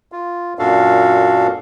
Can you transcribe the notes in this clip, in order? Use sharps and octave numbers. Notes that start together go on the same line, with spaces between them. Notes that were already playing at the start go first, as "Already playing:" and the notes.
F4
F#2 A#2 D4 F#4 A4 F5